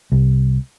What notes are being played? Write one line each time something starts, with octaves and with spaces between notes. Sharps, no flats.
C2